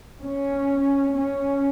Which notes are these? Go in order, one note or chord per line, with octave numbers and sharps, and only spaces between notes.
C#4
C#4